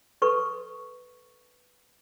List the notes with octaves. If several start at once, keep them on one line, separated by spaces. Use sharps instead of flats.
A4 B4 C#6